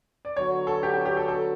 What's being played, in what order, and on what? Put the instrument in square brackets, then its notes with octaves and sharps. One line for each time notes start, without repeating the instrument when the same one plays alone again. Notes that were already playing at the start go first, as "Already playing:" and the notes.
[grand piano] D5
[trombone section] D3 F#3 B3 F#4 [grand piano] C#5
[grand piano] A4
G4
G4
G4
A4
A4